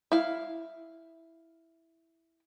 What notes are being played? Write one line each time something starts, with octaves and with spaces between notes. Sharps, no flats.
E4 F5